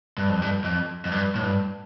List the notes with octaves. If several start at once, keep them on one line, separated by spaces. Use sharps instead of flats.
G2
F2
G2
F2
F2
G2
A2
G2